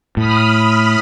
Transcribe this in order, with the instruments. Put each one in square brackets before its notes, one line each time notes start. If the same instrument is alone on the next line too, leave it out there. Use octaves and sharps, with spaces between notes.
[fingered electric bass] A2 [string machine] B5 D#6 F6